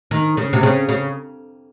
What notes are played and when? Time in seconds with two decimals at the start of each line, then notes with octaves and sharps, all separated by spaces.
0.11 D#3
0.37 C#3
0.53 C3
0.63 C#3
0.89 C#3